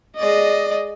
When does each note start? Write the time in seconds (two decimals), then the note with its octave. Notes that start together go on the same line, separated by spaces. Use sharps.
0.18 G#3 D5 D#5